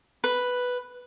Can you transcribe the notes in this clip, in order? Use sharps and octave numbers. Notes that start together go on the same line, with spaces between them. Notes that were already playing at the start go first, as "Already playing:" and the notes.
B4